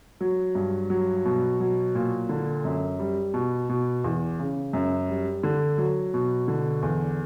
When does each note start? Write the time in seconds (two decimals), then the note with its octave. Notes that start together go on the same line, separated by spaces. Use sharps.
0.21 F#3
0.55 G2
0.90 F#3
1.25 B2
1.60 F#3
1.95 A#2
2.29 D3
2.65 F#2
2.99 G3
3.34 B2
3.69 B2
4.04 E2
4.40 C#3
4.73 F#2
5.09 G3
5.43 D3
5.78 F#3
6.14 B2
6.48 D3
6.83 E2